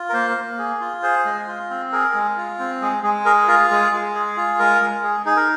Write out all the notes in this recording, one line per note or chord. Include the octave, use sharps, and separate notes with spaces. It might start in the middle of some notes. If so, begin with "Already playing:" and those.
Already playing: F4
A#4
A#3 C5
A#3
G#4
F4
G#4 C5
G#3
F4
C4
G#4 A#4
G#3
F4
C4
G#3 G#4
G#3 G#4
G#4 A#4
F4 A#4
G#3 G#4
G#3
G#4
F4
G#3 A#4
G#3
G#4
D#4 G#4
A#4